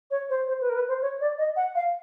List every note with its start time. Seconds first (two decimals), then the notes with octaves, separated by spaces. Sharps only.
0.11 C#5
0.29 C5
0.48 C5
0.61 B4
0.69 A#4
0.75 B4
0.88 C5
1.02 C#5
1.21 D5
1.38 D#5
1.56 F#5
1.75 F5